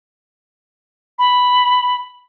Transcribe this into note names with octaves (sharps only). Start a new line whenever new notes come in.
B5